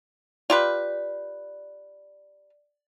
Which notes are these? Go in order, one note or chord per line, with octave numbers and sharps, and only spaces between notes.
F4 G4 B4 D5